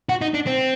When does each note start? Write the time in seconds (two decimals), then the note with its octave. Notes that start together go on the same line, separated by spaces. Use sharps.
0.09 F#4
0.22 D#4
0.34 D4
0.47 C4